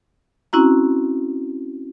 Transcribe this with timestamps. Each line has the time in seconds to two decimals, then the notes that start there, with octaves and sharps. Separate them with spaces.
0.53 C4 C#4 E4 F#4 A#5